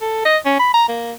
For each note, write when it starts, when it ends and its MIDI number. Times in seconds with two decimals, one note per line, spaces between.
0.01 0.21 69
0.25 0.37 75
0.45 0.59 61
0.60 0.71 83
0.74 0.85 82
0.89 1.12 58